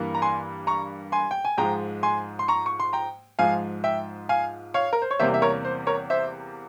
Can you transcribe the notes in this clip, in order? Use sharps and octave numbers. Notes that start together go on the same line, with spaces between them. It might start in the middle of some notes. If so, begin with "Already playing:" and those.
Already playing: G2 E3 A#3
A#5
G#5 C6
A#5 C#6
G#5 C6
G5
G#5
G#2 F3 G#3 G5 A#5
G#5 C6
C6
A#5 C#6
C#6
C6
G5 A#5
G#2 F3 G#3 F5 G#5
E5 G5
F5 G#5
C#5 F5
A#4
C5
C#5
E2 C3 G3 A#3 C5 E5
E5
A#4 C#5
C5
A#4 C#5
C5 E5